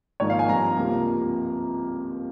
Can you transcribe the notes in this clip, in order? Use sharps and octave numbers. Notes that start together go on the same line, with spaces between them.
G#1 G#2 F3 A#3 D#4 C#5
F5
G#5
G2 F3 C4 A#5
C#2 C3 F3 A#3